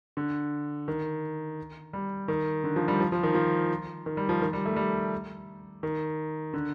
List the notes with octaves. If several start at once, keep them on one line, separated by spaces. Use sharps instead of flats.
D3
D#3
G3
D#3
D3
F3
G3
F3
F3
D#3
F3
D#3
G3
F3
D#3
G3
A3
G3
D#3
D3